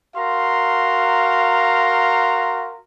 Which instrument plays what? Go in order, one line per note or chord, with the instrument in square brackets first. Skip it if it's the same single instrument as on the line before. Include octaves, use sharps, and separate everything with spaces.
[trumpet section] F#4 A#4 F5 A#5 C6